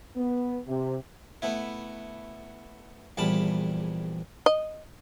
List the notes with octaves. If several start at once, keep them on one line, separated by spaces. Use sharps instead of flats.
B3
C3
A3 B3 E4
A#1 E2 G3 A5 B5
D#5